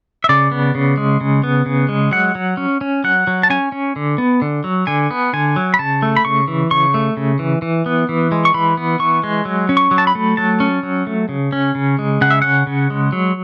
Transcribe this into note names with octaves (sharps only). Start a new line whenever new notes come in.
E5
C#3 D5
B3
C#3
G#3
C#3
B3
C#3
G#3
F#3 F#5
F#3
C#4
C#4
F#3 F#5
F#3
A5
C#4 G#5
C#4
D3
B3
D3
F#3
D3 G#5
B3
D3 G#5
F#3
B5
C#3 A5
A3
B5
C#3 C#6
E3
C#3 C#6
A3
C#3
E3
E3
B3
E3
G#3
C#6
E3 B5
B3
E3 C#6
G#3
F#3
C#4
C#6
F#3
A5
B5
A3
F#3 A5
C#4
F#3
A3
C#3
C#4
C#3
G#3
C#3 F#5
E5
C#4 F#5
C#3
G#3
F#3